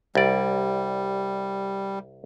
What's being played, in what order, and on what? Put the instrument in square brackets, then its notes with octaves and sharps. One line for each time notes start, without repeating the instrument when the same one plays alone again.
[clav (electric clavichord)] C2 D5 [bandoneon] G3